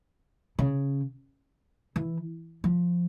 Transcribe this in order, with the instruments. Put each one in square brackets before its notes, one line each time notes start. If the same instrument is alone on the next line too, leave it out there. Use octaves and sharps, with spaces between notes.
[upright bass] C#3
E3
F3